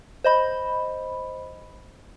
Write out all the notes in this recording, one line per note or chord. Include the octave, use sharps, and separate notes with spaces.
C5 D#5 B5